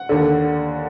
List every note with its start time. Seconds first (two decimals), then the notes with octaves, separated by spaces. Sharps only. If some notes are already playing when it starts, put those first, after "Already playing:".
Already playing: F#5
0.09 D#2 D3